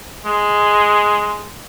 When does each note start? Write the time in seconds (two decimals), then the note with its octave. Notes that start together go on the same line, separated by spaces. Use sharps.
0.25 G#3